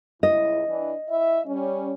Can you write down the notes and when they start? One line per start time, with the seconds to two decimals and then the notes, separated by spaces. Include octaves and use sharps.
0.23 C#2 E4 D#5
0.69 E3 D4
1.09 E4 E5
1.46 G3 C#4